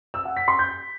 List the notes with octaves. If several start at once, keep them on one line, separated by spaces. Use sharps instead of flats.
E6
F#5
B6
C6
G6